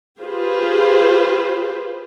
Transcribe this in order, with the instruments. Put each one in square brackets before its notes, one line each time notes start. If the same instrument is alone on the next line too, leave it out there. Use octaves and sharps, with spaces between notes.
[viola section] F4 G4 G#4 B4 C5